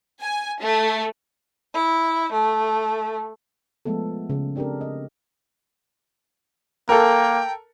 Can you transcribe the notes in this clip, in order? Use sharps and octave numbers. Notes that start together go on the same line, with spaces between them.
G#5
A3
E4
A3
F3 G#3 A3 B3 A4
C#3
C4 D4 G4 A4 A#4
D#5
A#3 A4 A#4 G5